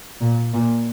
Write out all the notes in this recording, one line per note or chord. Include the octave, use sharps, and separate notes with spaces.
A#2
A#2